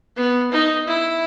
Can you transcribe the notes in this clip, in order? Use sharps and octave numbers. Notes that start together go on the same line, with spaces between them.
B3
D#4
E4